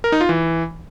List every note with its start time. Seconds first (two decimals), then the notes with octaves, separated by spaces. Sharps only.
0.04 A#4
0.12 D#4
0.21 F4
0.29 E3